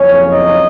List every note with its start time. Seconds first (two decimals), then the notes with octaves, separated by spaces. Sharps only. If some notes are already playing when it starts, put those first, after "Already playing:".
Already playing: F#1 F2 C#3 C#4 C#5
0.32 D#4 D#5